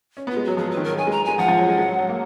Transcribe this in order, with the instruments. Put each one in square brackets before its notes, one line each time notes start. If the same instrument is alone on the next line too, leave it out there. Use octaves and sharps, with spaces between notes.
[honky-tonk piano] C#4
B3
[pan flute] F4
[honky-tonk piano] G#3
[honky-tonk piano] F#3 [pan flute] F#4
[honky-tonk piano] F3 [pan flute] G#4
[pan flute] B4
[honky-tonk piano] D#3
[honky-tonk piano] F#3 [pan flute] A#4
[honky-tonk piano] F#3 [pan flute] G#5
[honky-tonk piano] G#3
[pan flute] A#5
[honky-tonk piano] G#3 [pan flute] G#5
[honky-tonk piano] F3 [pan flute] F#5
[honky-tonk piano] F3
F#3
G#3
G#3
F#3
F#3
A#3